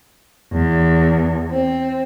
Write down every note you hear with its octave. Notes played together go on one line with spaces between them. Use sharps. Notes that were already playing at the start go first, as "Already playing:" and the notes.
E2
C4